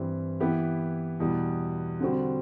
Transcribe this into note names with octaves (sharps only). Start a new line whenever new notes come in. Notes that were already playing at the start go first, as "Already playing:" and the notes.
Already playing: G2 E3 G3 C4
E3 B3 E4 G4
E2 B2 G3
D3 G3 C4 F#4